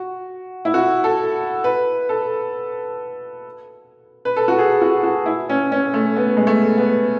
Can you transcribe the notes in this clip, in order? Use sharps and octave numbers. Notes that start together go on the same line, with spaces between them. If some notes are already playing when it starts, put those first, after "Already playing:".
Already playing: F#4
E4
F#4
A4
B4
A4
B4
A4
F#4
G#4
F#4
F#4
E4
C#4
C#4
A3
B3
G#3
A3
B3